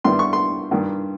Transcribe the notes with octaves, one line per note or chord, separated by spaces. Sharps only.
G2 D#3 G3 B3 E4 C6
C#6
C6
G2 D#3 G3